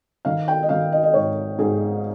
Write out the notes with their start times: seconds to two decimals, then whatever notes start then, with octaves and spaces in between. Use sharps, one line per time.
0.25 D#3 F5
0.48 G5
0.63 D#5
0.69 D#3 F5
0.92 D#5
1.04 D#5
1.13 G#2 C#5
1.59 G#2 G#4